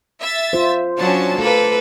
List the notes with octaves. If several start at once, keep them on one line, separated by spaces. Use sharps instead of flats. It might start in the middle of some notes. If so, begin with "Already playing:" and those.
E5 A6
F4 C5
F#3 C#4 D4 A5
A3 A#3 A4 B4